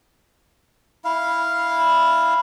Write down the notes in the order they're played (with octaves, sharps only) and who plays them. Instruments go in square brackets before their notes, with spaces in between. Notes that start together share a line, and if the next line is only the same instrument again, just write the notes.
[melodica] E4 F5